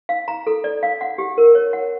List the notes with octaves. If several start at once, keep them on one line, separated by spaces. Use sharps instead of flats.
F5
A#5
A4
D5
F5
F#5
G4
A#4
C#5
F#5